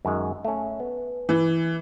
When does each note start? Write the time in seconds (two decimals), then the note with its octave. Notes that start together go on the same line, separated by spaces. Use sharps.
0.05 F#2 D#3 G#3
0.45 A3 C#4
0.80 B3
1.29 E3